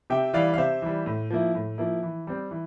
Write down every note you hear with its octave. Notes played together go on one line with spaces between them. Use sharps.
C3 E5 G5
E3 G3 D5 F5
F5
C3 C5 E5
E3 G3
A2
F3 A#3 E4
A2
F3 A#3 E4
E3
G3 C4
E3